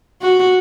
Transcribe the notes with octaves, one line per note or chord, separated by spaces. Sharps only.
F#4